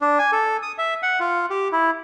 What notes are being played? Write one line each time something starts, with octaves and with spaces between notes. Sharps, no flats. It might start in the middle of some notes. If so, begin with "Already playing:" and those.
D4
G#5
A4
D#6
E5
F#5
F4
G4
E4